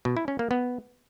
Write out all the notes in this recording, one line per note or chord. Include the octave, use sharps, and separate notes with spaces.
B2
E4
C#4
A#3
B3